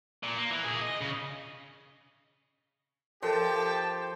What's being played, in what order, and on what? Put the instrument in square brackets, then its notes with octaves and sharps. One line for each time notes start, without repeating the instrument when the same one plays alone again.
[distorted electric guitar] A#2
A#3
E3
A#2 G#4
D#5
C#3
[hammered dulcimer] F3 [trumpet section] G4 A5 [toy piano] A4 A#4 C#5 [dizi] G5